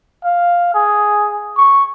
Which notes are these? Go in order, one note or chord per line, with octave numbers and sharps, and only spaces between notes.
F5
G#4
C#6